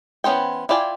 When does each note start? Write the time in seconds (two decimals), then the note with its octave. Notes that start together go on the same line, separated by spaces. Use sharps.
0.24 E3 B3 C#4 C5 G5
0.69 E4 F4 D5 G5 G#5